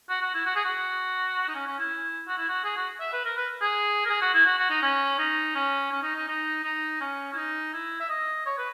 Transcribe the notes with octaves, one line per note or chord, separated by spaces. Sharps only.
F#4
F#4
E4
F#4
G#4
F#4
D#4
C#4
C#4
E4
F#4
E4
F#4
G#4
F#4
E5
B4
A#4
B4
G#4
A#4
G#4
F#4
E4
F#4
F#4
D#4
C#4
D#4
C#4
C#4
D#4
D#4
D#4
D#4
C#4
E4
D#4
E4
E5
D#5
C#5
B4